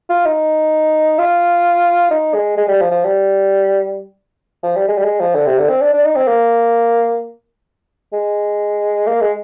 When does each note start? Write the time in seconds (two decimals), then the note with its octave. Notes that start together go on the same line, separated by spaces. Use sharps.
0.10 F4
0.26 D#4
1.18 F4
2.11 D#4
2.34 G#3
2.57 G#3
2.68 G3
2.81 F3
2.91 F3
3.04 G3
4.63 F3
4.76 G3
4.88 G#3
4.98 G3
5.04 G#3
5.20 F3
5.35 D3
5.46 C3
5.59 D3
5.69 C4
5.81 D4
5.93 D4
6.04 D#4
6.16 C4
6.28 A#3
8.13 G#3
9.07 A#3
9.21 G#3